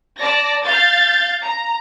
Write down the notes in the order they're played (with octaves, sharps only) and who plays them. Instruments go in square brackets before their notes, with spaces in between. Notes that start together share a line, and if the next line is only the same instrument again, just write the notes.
[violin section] D5 A5 A#6
F5 G6 A6
A#5